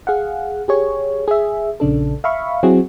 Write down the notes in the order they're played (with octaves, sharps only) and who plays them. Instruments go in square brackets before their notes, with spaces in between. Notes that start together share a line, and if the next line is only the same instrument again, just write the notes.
[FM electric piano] G#4 F5 F#5
G4 G#4 C#5
G#4 E5
A#1 C#3 D4 A4
E5 F5 B5 C#6
F#3 C4 E4 F#4 G#4